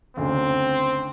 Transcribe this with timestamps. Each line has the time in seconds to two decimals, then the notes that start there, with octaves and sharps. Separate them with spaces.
0.17 F#1 D2 C4